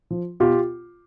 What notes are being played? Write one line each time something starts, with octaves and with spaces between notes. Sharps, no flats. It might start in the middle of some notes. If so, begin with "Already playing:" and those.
F3
B2 F4 G4